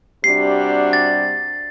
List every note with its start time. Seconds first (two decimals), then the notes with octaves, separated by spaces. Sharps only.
0.24 C3 G3 D4 F#4 C7
0.93 A6